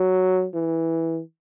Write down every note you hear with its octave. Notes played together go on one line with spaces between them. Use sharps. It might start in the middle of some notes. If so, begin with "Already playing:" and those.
Already playing: F#3
E3